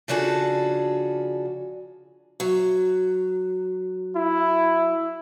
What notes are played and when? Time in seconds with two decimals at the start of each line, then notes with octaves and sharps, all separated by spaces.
0.08 C#3 F3 D4 F#4 G#4 A4
2.40 F#3
4.16 E4